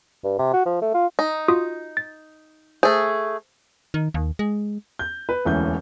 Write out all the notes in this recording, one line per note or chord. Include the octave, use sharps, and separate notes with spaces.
G2
C3
F#4
F3
A3
F4
D#4
F4 F#4 D#6
A6
A3 G#4 C5
D#3
D#2
G#3
G6
B4
E1 D2 E3 C#4 G6